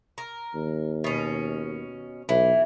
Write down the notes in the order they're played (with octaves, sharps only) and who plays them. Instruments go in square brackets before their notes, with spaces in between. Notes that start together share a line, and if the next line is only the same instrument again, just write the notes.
[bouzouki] A#4
[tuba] D#2
[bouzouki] B2 C#4
[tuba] B1 [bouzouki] E3